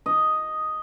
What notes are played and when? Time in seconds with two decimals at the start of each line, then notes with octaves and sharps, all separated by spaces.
0.06 D#5